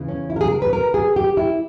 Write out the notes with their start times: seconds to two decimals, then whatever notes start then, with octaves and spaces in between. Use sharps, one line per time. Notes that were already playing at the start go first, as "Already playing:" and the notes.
Already playing: E2 C#3 E3
0.09 C#4
0.30 E4
0.36 A#4
0.41 G#4
0.51 A#4
0.62 B4
0.73 A#4
0.94 G#4
1.16 G4
1.37 E4